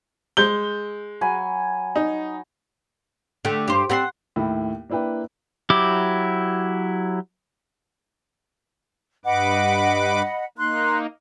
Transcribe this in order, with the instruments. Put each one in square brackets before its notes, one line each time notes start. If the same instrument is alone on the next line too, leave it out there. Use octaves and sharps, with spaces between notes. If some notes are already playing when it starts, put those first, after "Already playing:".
[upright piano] G#3 G6 G7
[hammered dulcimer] F#3 G#5 B5
[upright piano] D#4
[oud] D3 A3 [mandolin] G4
[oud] G2 C5 [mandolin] G4
[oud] G3 C4 [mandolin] F#5 A#5 C6
[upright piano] D#2 A2 E4 B5
A#3 D4 E4 B4 G5
[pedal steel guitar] F#3 E4 G4 D6
[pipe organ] G2 B4 D6 [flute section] D#5 F#5 B5
[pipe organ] A#3 D#4 [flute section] C6 F#6